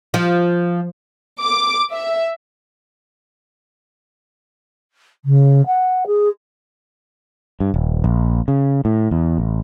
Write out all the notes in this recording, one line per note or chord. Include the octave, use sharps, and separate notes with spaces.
F3
D6
E5
C#3
F#5
G#4
G2
D#1
A#1
C#3
A2
E2
A1